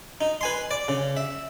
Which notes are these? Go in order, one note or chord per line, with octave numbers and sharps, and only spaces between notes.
D#4
B4 G#5 C6
D5
C#3
E5